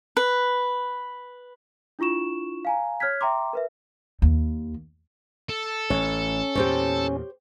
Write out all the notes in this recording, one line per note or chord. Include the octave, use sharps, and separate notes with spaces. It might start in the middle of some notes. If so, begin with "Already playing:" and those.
B4
D4 E4 F4 C#6 E7
F5 G#5 A#5
C#5 F6 F#6 G#6 B6
E5 G5 A#5 C6 D6
A#4 B4 E5
D#2
A4
A1 C#4 C#5
E2 A#2 G4 C5 C#5